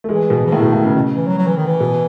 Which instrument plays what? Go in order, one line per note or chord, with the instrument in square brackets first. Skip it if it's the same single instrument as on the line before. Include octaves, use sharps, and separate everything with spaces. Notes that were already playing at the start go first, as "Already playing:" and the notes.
[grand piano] A3
[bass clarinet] E3 [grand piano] G#3
[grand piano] B2
[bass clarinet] E3
[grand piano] A2 [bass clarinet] D#3
[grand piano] B2
A2
C#3
[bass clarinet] B2
E3
F#3
F#3
E3
D#3
E3
[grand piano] B2